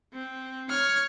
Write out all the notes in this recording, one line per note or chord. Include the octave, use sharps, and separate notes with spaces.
C4
C#5 F6